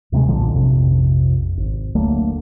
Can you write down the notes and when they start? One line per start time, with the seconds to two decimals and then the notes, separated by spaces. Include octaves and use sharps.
0.12 D2 C3 F#3 G#3
0.28 B1 A#2 D3 F3
0.54 A#1 F2 C3
1.57 G#1
1.95 D2 F#3 A3 A#3